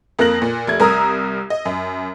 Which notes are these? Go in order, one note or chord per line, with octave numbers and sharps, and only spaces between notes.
F2 A#3 A#4 F#6 A#6 F#7
A#2
F1 A3 G#6
C2 A#4 A#5 D#6 E6
D#5
F#2